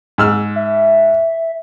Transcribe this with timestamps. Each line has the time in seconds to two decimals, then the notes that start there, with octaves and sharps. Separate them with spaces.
0.18 G#2 E6 F6
0.56 E5